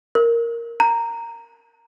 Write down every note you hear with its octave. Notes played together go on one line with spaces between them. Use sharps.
A#4
A#5